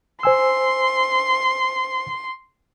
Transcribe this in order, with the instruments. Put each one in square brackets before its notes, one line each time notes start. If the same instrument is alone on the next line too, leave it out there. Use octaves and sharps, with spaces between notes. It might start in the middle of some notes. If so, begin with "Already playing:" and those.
[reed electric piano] C5 G#5 E6 [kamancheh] C6